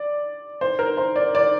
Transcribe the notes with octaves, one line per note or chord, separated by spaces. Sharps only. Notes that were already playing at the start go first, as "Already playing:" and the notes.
Already playing: D5
C5
A#4
C5
D5
D5